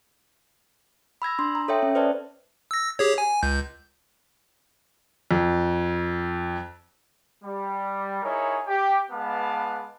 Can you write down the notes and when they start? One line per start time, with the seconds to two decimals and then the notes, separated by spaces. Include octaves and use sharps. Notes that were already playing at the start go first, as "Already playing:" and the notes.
1.22 B5 E6 G#6 A#6
1.39 D4 C6
1.55 A#5
1.68 A4 C#5 E5 G5
1.83 C#4
1.95 B4 C5 D5 A5
2.71 E6 A#6
2.99 G4 G#4 C#5
3.18 G#5
3.43 C#2 G6
5.31 F2
7.43 G3
8.23 D#4 E4 G#4 A#4 C#5
8.67 G4 G5
9.10 G#3 B3 B4 F5 A5 D6